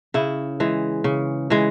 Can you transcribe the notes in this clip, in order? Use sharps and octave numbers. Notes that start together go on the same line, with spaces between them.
C#3 E4
E3 G#3
C#3
E3 G#3